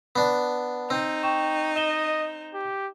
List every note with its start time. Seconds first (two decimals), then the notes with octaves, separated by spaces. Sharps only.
0.16 B3 D4 F#5 A5
0.90 C4 D#4
1.23 G5 C#6 E7
1.76 D#5 E7 G7
2.54 G4